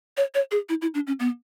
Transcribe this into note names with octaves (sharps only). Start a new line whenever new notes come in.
C#5
C#5
G#4
E4
E4
D4
C#4
B3